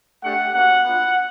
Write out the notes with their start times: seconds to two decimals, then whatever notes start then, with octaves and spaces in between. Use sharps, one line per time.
0.24 A3 D4 G4 F#5
0.54 A#3 C#4 F#4 F#5
0.85 B3 D4 F4